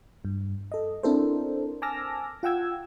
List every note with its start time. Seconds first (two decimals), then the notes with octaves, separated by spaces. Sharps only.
0.25 G2
0.72 A4 D#5
1.03 C4 D4 E4 A4 A#4 C5
1.82 G#5 A5 D6 E6 F6 A#6
2.43 F4 F#5 G5 E6 G#6